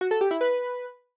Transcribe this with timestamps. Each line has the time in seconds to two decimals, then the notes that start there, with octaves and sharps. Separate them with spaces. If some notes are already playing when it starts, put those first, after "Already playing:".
0.01 F#4
0.11 A4
0.21 G4
0.31 E4
0.41 B4